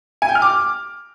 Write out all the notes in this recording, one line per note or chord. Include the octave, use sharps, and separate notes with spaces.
G#5
G5
F6
D6